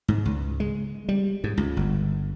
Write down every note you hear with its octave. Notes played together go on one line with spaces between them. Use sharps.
G#2
C#2
G#3
G3
G#2
C#2
G1